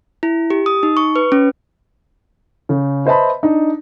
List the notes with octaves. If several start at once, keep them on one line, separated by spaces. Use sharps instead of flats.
E4
G4
D#6
D#4
C#6
B4
C#4
C#3
B4 C5 D#5 E5 A5 B5
D4 D#4